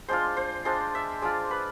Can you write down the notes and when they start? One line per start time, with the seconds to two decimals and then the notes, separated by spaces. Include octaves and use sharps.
0.09 G#3 D4 F4 C5
0.37 C5
0.65 G#3 D4 F4 C5
0.95 E5
1.22 G#3 D4 F4 D5
1.51 B4